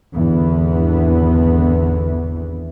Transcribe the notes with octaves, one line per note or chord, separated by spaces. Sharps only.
G#1 E2 D3 E3 B3